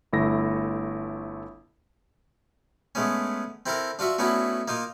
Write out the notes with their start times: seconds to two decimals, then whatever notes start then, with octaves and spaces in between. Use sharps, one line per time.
0.13 G1 A3 E4 A#6
2.95 G#3 A3 B3 C#4
3.66 C4 E4 A4 A#4
3.99 D4 F4 F#4 E5
4.19 A3 B3 C#4 D4 E4 F#4
4.68 A#3 D#4 F4